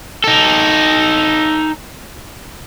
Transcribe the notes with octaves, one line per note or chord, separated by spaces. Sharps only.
D#4 A4